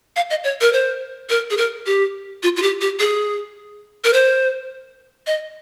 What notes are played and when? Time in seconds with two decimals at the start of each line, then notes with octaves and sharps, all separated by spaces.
0.16 F5
0.30 D#5
0.44 C#5
0.61 A#4
0.73 C5
1.29 A#4
1.50 G#4
1.57 A#4
1.86 G4
2.43 F4
2.56 F4
2.62 G4
2.81 G4
2.99 G#4
4.04 A#4
4.13 C5
5.27 D#5